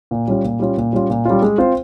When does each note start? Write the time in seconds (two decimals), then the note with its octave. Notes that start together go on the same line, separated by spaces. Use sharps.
0.11 A#2
0.28 G3 C#4 F4
0.44 A#2
0.60 G3 C#4 F4
0.77 A#2
0.93 G3 C#4 F4
1.10 A#2
1.25 G3 C#4 F4
1.42 G#3
1.58 C4 F4 C5